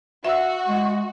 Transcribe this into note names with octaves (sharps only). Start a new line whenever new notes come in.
F#4 E5 E6
G#3